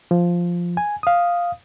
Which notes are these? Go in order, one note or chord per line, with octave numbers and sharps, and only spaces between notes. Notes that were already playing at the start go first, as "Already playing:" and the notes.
F3
G#5
F5 D#6